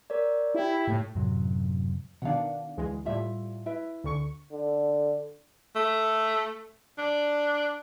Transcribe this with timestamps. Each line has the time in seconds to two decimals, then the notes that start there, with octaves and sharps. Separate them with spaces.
0.10 A#4 C#5 D5
0.55 E4 G4 G5
0.88 A2
1.15 F#2 A2 C3 F#3
2.22 B2 D#3 D4 F5 F#5
2.77 D2 E3 G#3
3.05 A2 G3 F4 E5
3.66 E4 B4 E5
4.04 D2 D3 C#6
4.52 D3
5.75 A3
6.98 D4